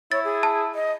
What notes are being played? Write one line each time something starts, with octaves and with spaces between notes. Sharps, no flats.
E4 C#5 A6
G#4
A5
D#5